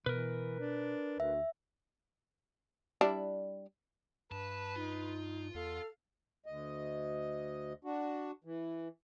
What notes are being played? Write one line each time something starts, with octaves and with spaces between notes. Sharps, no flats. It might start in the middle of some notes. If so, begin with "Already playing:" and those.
B2 E3 A#4 B4
D4
D2 E5
G3 D4 E4
G2 B4 A5
D#4 F4
E2 A4 F5
D2 D#5
D4 F#4
E3